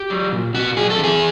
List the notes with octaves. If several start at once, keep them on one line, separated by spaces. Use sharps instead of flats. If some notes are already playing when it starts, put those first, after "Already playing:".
Already playing: G4
F#3
A#2
A#2 F#4
F#3 G#4
A4
E3
G#4